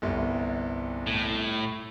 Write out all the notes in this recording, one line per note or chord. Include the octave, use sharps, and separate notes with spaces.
G1 C2
A2